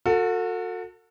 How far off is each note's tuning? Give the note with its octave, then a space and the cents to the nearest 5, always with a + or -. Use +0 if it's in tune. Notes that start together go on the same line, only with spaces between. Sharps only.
F#4 -30 A4 +30